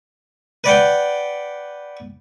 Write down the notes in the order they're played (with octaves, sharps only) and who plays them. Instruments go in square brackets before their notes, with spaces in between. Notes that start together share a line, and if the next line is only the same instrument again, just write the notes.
[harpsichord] B4 D5 F#5 G5